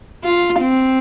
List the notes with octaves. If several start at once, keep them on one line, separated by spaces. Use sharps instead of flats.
F4
C4